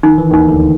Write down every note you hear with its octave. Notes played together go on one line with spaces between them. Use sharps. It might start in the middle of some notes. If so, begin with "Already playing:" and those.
D#3 D#4
E3
D#2 D#3 D#4
D2 D3